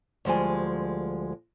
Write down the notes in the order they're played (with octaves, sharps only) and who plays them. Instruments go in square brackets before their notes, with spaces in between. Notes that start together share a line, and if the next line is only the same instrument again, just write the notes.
[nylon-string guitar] D2 F3 G3 G#3 G#5